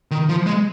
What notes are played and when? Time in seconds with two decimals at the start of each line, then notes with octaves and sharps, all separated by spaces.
0.11 D#3
0.29 F3
0.46 G#3